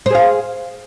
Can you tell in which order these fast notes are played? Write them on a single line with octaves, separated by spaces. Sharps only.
C5 G#4 F5